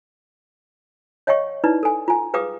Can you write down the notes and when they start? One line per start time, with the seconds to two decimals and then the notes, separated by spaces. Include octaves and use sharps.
1.27 C#5 D#5 F5 G5 C#6
1.64 D#4 E4 B4 D5
1.83 A4 G#5
2.08 F4 G#5
2.34 G#4 B4 F5 G5 D6 D#6